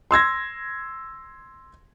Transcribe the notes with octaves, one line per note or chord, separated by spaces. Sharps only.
C6 E6 G#6 A#6